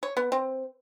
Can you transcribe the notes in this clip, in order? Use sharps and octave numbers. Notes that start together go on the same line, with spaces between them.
C#5
B3
C4